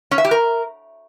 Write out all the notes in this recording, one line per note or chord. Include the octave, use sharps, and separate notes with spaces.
C#4
E5
G4
A#4